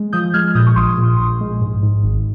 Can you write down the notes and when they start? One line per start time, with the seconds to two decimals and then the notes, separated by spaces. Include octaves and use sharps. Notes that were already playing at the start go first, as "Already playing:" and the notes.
Already playing: G#3
0.13 F3 D#6 G6
0.34 G#3 F6 G#6
0.55 A#2 D#6 G6
0.66 C#6
0.76 A#1 C6 D#6
0.98 A#2
1.19 A#1
1.41 G#3
1.61 G#2
1.83 G#2
2.04 G#1